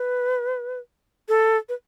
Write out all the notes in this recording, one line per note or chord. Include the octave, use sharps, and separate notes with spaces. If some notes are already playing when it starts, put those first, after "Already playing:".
Already playing: B4
A4
B4